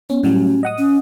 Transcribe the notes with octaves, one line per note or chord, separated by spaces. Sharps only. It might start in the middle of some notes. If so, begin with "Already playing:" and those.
B3 C#4
A2 F#3 G3 C#4
D#5 F#5 D#6
C#4